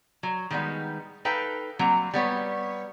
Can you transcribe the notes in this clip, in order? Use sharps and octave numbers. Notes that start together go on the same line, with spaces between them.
F#3
D#3 G3 G#3 B3 D#4
D#4 A4 B4 F5 G5
F#3 G3 A#3 C4
G3 B3 C#5